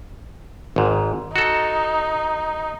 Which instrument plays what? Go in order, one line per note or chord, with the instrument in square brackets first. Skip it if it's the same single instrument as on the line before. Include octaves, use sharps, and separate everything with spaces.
[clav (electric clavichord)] G#1 G#2
[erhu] D#4 [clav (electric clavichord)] F#4 A4